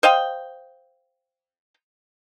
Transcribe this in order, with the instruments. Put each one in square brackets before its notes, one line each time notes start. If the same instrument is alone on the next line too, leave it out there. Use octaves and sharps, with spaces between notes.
[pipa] C5 D#5 F5 G5